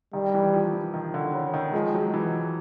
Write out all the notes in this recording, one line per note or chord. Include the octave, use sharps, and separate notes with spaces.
D#3 G3
E3
F3
E3
D#3
D3
C#3
D#3
F3 G#3
F#3
E3